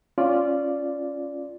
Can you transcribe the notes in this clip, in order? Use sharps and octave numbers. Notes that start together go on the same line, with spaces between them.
C#4 F4 D5